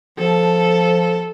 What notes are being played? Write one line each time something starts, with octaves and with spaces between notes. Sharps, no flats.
F3 A4